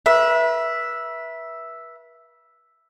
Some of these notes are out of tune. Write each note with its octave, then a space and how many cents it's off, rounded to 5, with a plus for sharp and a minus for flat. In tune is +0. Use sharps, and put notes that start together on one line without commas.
B4 -35 E5 +0